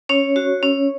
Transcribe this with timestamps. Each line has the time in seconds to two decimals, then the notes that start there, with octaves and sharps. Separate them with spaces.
0.09 C#4 C#5
0.36 F#4
0.63 C#4